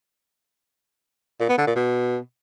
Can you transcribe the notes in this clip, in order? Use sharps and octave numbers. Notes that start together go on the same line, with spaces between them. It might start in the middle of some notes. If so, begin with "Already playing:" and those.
A#2
B3
D3
A#2
B2